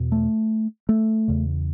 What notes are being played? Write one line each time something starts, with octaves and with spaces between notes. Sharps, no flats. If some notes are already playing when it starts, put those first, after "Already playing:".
Already playing: E2 B2
A3
A3
E2 C#3